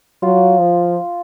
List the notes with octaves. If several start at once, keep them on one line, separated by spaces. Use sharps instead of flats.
F#3 F4
F3